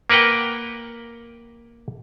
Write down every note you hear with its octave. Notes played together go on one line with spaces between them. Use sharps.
A#3 A#4 B4 F#5 G5